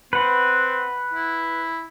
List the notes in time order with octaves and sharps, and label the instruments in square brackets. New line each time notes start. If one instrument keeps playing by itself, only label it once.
[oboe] C4 [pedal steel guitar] B4 F#5
[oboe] E4